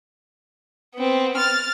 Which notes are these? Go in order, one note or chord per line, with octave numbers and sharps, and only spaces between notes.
B3 C4
F6 A6